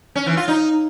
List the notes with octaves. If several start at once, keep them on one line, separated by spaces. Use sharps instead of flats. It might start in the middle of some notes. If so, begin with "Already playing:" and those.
C#4
E3
F4
D#4